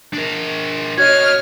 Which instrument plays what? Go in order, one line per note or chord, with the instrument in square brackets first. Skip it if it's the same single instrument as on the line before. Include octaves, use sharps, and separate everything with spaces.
[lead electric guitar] D4 A#4
[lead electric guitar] F#4 D#5 [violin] C#5 F6 [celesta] G#6